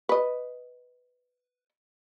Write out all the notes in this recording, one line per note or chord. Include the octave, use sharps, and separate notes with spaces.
B4 D#5